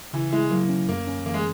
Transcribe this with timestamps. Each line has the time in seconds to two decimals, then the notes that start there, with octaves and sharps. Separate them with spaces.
0.13 C#3 E3
0.33 G#3 E4
0.51 F#3 A#3
0.69 C#4
0.89 F#2 A#3
1.07 C#4
1.26 E3 A#3
1.34 G#3